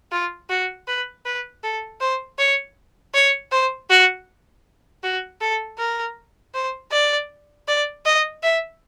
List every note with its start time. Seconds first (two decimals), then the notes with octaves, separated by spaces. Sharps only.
0.12 F4
0.49 F#4
0.88 B4
1.25 B4
1.63 A4
2.00 C5
2.39 C#5
3.14 C#5
3.52 C5
3.90 F#4
5.03 F#4
5.41 A4
5.79 A#4
6.54 C5
6.92 D5
7.68 D5
8.06 D#5
8.43 E5